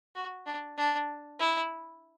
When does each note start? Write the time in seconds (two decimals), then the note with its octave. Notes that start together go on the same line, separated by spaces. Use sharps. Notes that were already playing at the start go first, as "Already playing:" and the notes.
0.15 F#4
0.46 D4
0.77 D4
1.40 E4